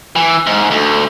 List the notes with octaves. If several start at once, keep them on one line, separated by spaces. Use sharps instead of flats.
E3
G#2
D2